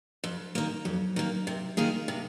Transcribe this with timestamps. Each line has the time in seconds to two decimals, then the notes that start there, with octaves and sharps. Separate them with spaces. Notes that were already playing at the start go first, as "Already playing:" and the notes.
0.24 F2
0.55 D#3 A#3
0.85 F2 F#3
1.16 D#3 A#3
1.47 C3
1.77 D#3 A#3 F4 G#4
2.08 C3